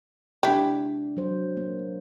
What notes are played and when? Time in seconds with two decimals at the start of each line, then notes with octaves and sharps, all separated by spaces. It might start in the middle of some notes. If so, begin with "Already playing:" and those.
0.43 C3 G#3 D4 E4 G4
1.17 F#3 C5
1.57 A#3